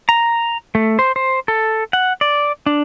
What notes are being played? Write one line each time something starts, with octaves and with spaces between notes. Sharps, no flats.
A#5
A3
C5
C5
A4
F#5
D5
D4